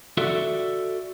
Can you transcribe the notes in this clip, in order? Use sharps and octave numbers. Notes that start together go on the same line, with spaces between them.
F#4 A4 D5 E5